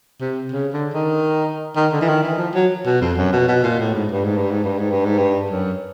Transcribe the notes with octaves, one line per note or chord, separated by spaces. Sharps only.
C3
C#3
D3
D#3
D#3
D3
E3
D#3
E3
F3
F#3
B2
F2
F#2
B2
B2
A#2
A2
G#2
G2
G#2
G2
G#2
G2
G#2
G2
G#2
G2
F#2